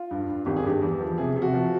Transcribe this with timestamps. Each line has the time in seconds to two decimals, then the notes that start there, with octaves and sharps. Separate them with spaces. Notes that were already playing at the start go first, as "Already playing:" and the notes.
Already playing: F4
0.11 G2
0.29 G2
0.46 G#1 G4
0.57 G#4
0.64 G2 G4
0.82 E2
1.00 F3
1.18 C3 G#4
1.36 C3
1.42 F#4
1.54 F3